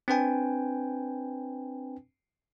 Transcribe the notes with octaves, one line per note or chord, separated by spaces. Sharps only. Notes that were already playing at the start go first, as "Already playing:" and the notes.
C4 D4 B4 G5 G#5